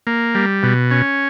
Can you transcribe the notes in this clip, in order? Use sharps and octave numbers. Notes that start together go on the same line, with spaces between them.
A#3
G3
B2
C#4